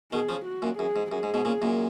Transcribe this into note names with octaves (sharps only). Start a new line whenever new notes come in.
B2 D#3 G#4
C#3 F3
F#4
F#2 A#2
F#2 G#4
G#2
F#2 G#4
G#2
G#2 B2
A#2 C#3
F#2 A#2